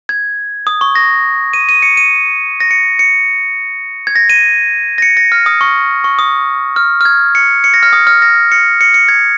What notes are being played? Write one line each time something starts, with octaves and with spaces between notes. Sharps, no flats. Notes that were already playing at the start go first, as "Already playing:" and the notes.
G#6
D#6
C#6
A#6
D#7
D#7
C#7
D#7
A#6
C#7
C#7
G#6
A#6
D#7
A#6
C#7
A#6
F6
D#6
C#6
C#6
D#6
F6
F6
G#6
C#7
C#7
A#6
F6
D#6
F6
A#6
C#7
C#7
C#7
G#6